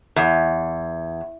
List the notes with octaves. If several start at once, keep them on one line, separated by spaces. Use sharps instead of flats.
E2